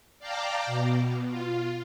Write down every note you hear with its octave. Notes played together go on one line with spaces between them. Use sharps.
D5 F5 G5 A5 A#5 D6
B2
F4